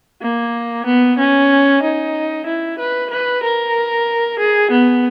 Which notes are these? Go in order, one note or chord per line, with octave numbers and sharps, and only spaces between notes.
A#3
B3
C#4
D#4
E4
B4
B4
A#4
G#4
B3